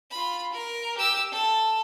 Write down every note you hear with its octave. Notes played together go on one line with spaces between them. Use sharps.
F4 B5
A#4
G4 E6
A4